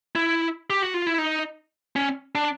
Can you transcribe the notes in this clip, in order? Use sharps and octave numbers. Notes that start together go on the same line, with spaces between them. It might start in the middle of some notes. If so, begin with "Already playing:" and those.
E4
G4
F#4
F4
E4
D#4
C#4
D4